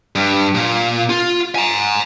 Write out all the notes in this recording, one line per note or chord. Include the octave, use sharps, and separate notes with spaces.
G2
A#2
F4
G#5 A#5